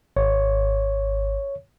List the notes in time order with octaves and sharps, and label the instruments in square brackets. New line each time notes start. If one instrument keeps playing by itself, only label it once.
[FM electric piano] G#1 [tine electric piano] C#5